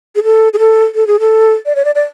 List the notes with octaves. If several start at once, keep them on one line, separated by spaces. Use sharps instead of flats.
G#4
A4
G#4
A4
A4
G#4
A4
D5
C#5
D5
D5